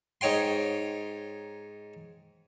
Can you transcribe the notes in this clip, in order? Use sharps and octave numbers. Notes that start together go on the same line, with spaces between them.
G#2 D#4 C#5 G5 C6